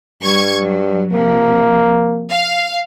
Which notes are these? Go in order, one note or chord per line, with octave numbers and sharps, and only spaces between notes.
G2 G3 C#6 G#6
F#3
C3 F3 A#3
F5